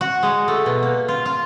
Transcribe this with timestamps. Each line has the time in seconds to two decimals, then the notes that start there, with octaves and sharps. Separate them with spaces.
0.01 F#4
0.23 G#3
0.48 A3
0.66 B2
0.83 A#3
1.08 F4
1.26 F4